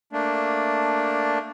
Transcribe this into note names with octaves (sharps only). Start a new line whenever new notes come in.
A3 A#3 D4